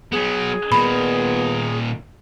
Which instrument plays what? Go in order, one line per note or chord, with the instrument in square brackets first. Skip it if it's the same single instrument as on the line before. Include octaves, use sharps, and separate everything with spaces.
[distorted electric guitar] F#3 B3 [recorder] G#4
[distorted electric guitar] A#2 D#3 [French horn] B3 [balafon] B5